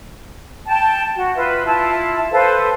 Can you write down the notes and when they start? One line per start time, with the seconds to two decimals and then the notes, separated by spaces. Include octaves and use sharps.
0.67 G5 A5
1.15 F#4
1.35 F4 B4 E5
1.66 E4 F4 A5
2.31 A4 B4 C5 F5